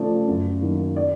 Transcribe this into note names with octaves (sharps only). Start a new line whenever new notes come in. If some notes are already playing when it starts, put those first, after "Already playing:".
Already playing: C#3 F3 A3 D5
F#2
D#3 F#3 A#3
D5